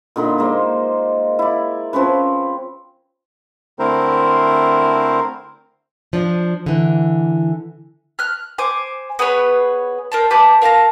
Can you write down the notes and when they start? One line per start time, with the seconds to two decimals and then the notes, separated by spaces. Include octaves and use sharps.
0.16 A#2 D3 D#4 B5
0.38 G#3 A#3 C5
1.39 E4 D5
1.93 F3 C4 C#4 B4
3.79 D3 A3 C4 E4 A#4 C5
6.13 F3 D4
6.66 D3 E3
8.19 F6 F#6
8.58 C5 G#5 D6
9.19 B3 G#4 B4 C#5
10.12 A#4 C5 A5
10.30 G4 B4 A5 D6
10.62 A#4 F5 A5 A#5